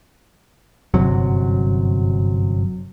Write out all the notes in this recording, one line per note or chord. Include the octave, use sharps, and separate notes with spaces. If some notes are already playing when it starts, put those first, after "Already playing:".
G1 F#2 C3 F#3